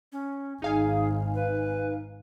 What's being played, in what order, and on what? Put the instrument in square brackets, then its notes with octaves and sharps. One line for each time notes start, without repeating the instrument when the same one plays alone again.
[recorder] C#4
[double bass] G#1 [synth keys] D#4 F5 G#5 [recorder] G#4
[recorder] B4